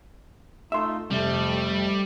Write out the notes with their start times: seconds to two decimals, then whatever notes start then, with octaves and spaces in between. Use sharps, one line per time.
0.72 A3 D#4 F4 E5 C6
1.10 F2 C3 G3 A3